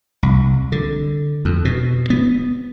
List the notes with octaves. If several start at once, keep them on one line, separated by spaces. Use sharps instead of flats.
C2
D3
F2
B2
B3